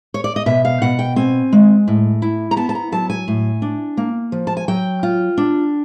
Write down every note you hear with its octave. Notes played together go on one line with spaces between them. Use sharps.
C#5
D5
D#5
B2 E5
F5
B2 F#5
G5
C4 G#5
G#3
A2
E4
A#5
B3 A5
A5
A#5
F#3 A5
G#5
A2
D4
A#3
F3
A5
G#5
F#3 G5
F4
D4